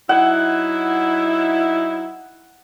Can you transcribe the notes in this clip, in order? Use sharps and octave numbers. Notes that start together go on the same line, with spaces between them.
F#3 D#4 E4 F#5